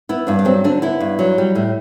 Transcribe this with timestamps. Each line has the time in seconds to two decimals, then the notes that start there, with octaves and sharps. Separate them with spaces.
0.09 B3 E4
0.27 G2 D4
0.39 D4
0.45 F#3 C4
0.64 D3 D4
0.82 B3 E4
1.00 G2
1.19 F#3
1.38 G3
1.55 A2